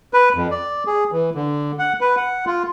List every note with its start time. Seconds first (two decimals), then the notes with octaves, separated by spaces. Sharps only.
0.14 B4
0.34 F2
0.51 D5
0.87 G#4
1.12 E3
1.35 D3
1.79 F#5
2.01 B4
2.17 F#5
2.46 F4